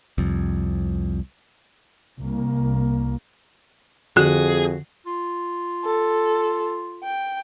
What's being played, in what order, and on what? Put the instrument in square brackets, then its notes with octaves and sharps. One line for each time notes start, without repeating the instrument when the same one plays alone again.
[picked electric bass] C2 F2
[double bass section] C2 A#3
[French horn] F2 [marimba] D3 [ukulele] F#4 [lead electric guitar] G#4
[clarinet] F4
[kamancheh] A4
G5